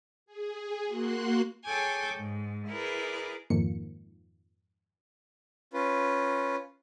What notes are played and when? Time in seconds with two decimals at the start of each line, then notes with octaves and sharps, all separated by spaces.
0.26 G#4
0.86 A#3 F#4 C6 F#6
1.66 G#4 A4 C#5 G5 G#5 D6
2.13 G#2
2.69 E4 G#4 A#4 B4 D5
3.50 F2 G#2 D#3 F3 A#3 C#7
5.73 C#4 F4 B4